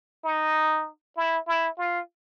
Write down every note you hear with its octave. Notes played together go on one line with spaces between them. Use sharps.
D#4
E4
E4
F4